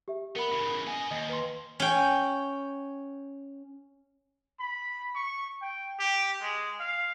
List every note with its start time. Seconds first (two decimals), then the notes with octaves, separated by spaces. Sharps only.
0.08 G4 E5
0.36 B3 A#4 B5
0.52 C#3 E3
0.87 B3 D#5 G#5
1.11 D#2 D#5
1.29 B4 C6
1.80 C#4 G5
4.60 B5
5.15 C#6
5.62 G5
5.99 G4
6.41 G#3
6.80 F5